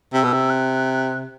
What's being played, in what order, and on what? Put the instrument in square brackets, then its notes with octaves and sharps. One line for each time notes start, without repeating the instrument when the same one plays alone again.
[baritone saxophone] C3 [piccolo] E6
[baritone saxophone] B2
C3
[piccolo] F#6